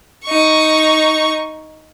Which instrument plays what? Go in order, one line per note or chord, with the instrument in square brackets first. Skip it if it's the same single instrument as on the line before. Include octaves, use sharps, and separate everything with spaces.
[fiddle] D#4 C#6